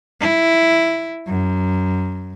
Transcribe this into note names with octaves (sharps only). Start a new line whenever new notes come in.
E4
F#2